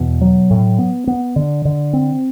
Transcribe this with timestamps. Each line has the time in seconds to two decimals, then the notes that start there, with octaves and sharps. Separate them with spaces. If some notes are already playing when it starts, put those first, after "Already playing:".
Already playing: E2 B2
0.21 F#3
0.50 A2
0.79 B3
1.07 B3
1.36 D3
1.65 D3
1.93 C4